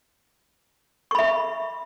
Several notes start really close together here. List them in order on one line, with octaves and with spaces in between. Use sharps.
C#6 B5 E5